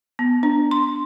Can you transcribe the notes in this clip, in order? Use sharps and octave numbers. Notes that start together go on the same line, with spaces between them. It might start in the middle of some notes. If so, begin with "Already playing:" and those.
B3
D4
C6